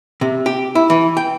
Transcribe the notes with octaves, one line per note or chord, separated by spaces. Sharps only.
C3
G4
E4
E3
G5